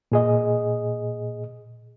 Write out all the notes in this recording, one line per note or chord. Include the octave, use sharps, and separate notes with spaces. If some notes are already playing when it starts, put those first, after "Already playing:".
A#2 G#4 D#5